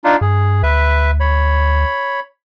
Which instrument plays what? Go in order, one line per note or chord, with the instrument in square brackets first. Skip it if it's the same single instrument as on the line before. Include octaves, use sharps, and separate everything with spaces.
[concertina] D4 D#4 F4
[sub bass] G2 [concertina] G#4
[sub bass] D2 [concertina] B4 E5
[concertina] C#5 B5